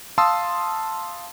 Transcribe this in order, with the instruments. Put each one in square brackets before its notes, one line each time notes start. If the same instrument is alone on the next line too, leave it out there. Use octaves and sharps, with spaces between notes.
[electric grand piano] F5 A5 C6 D#6 E6